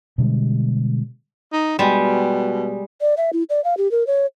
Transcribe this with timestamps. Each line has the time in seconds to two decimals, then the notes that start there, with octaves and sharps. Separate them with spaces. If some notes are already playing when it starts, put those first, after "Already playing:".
0.18 B2 D3 G3 G#3
1.53 D#4
1.79 B2 G3 G#3
3.01 D5
3.17 E5
3.33 E4
3.50 D5
3.64 F5
3.77 G4
3.91 A#4
4.07 C#5